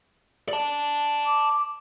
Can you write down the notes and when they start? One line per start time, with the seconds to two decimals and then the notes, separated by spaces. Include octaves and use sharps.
0.49 D5 A5
1.26 D6